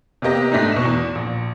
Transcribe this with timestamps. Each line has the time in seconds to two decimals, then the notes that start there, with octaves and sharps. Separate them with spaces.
0.22 C3 A#3 B3 G4 D#5 A#6
0.52 G#2 A3 D4 D#4
0.72 B2 E7
0.85 E2
1.15 A#1